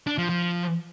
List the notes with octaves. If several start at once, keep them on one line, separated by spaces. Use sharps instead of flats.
D4
F3
F3